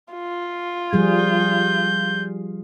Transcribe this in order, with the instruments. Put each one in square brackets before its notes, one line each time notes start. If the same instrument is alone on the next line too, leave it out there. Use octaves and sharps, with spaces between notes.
[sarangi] F4
[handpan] F3 G3 G#4 [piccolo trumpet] G6